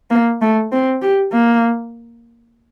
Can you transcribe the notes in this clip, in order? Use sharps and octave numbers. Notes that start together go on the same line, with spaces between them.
A#3
A3
C4
G4
A#3